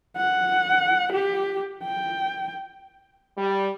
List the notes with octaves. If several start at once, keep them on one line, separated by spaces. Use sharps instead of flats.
F#5
G4
G5
G3